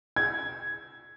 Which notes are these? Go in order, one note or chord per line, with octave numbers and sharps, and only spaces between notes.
G#6